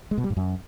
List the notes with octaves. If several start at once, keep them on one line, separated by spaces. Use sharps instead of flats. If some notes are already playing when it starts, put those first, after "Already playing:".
G#3
B2
G3
G#2
F#2